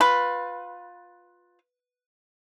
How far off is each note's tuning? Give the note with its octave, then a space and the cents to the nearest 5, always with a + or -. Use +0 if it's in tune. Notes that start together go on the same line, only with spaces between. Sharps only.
F4 +20 B4 +0